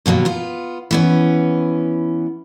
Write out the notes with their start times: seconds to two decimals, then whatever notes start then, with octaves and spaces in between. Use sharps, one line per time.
0.06 D#2 B2 F#3 A#3
0.25 B3 F4
0.91 E3 B3 C#4